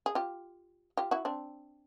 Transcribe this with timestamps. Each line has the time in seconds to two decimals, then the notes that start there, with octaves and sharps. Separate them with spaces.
0.06 G#4
0.15 F4 G4
0.97 F4 G4
1.11 E4 F#4
1.25 C4 D4